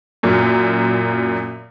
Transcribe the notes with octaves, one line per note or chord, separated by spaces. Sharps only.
F#2 A#2